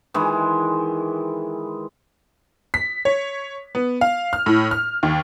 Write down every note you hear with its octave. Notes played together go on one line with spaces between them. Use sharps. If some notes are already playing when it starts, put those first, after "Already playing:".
D#3 E3 G#3 E4
B6
C#5
B3
F5
F6
A2
F6
D#2